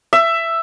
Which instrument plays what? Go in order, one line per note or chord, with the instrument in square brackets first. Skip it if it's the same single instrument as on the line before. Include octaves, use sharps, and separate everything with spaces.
[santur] E5